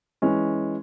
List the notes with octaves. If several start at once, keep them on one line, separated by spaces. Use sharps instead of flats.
E3 G#3 C#4